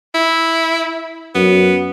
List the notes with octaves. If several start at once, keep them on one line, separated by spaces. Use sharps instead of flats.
E4
F#2 B3